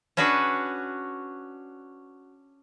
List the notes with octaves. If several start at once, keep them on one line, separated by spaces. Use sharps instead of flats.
C#4 D4 F#4 G#4 B4